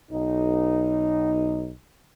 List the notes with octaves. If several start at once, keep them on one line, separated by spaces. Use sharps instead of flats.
B1 D#4